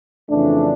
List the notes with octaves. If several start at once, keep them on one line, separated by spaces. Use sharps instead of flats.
F2 C#3 E3 A3 D4